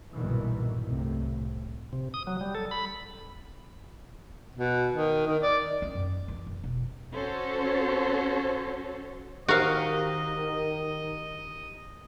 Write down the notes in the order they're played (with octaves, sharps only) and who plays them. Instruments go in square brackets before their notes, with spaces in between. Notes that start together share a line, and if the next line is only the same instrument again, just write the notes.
[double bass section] B1 G2 A#2 D#3 E3
C2 A2 C3
[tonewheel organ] C3
D#6
F#3
G3
A4
B5
[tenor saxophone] B2
D#3
D#3
D5
[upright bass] C#4
F#2
E3
F#2
E1
[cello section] C#4 F#4 A4 C5 C#5
[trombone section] D#3 [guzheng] F#4 F5 [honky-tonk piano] G4 A#4 C5 [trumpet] D#5